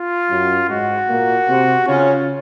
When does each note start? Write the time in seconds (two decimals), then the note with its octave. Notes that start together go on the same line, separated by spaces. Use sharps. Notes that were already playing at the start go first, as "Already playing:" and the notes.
Already playing: F4
0.29 F#2 F#3
0.69 G#2 G#3 F#4
1.08 A#2 A#3
1.48 C3 C4
1.87 C#3 C#4 F4